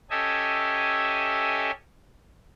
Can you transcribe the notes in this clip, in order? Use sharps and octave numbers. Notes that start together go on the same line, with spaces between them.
C#4 G4 A4 D#5 E5 G#5